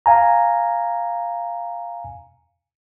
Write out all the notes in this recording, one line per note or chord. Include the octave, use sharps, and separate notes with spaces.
F5 G#5 A#5